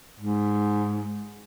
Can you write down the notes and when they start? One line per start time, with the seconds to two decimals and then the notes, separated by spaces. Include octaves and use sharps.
0.20 G#2